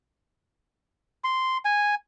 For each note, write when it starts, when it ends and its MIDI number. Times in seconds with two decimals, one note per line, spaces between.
1.24 1.58 84
1.65 1.95 80